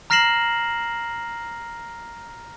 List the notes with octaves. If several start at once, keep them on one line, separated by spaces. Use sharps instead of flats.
A#5 F6 A#6 C7 E7 F#7